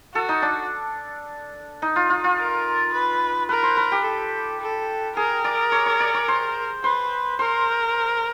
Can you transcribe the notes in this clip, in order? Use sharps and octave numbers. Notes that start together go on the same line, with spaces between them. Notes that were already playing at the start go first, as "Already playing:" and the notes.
F#4 A4
D#4
D4
D#4
F4
F4
F4
A#4
B4
A#4 B4
C5
B4
G4
A4
A4
G#4 A#4
D5
C#5
C#5
D5
C#5
C5
B4 C5
A#4 C5